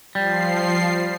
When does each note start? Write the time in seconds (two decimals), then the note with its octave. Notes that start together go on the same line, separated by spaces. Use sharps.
0.15 F3 G3 C7